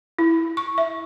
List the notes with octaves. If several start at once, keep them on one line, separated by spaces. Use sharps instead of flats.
E4
C#6
E5